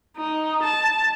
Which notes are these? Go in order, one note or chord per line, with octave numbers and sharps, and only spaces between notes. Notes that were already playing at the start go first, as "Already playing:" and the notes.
D#4
A5